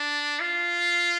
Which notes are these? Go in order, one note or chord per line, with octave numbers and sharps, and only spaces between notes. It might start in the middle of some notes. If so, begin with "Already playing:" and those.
Already playing: D4
F4